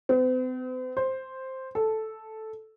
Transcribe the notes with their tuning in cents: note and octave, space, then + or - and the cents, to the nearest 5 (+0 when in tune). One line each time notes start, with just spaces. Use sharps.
C4 -45
C5 +5
A4 -5